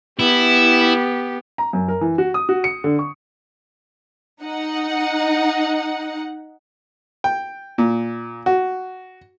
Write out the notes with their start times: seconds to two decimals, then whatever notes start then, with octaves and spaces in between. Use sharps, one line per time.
0.19 B3 E4 G4
1.58 A#5
1.73 F#2
1.88 A#4
2.01 E3
2.18 F#4
2.34 D#6
2.49 F#4
2.64 C#7
2.84 D3
2.99 C#6
4.42 D#4 F#5
7.24 G5
7.78 A#2
8.46 F#4